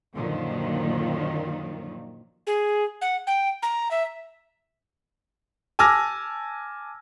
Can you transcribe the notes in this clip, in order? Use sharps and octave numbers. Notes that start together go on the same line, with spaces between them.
F#2 A#2 D3 D#3 F3 F#3
G#4
F#5
G5
A#5
E5
G#5 A5 D6 E6 F6 A#6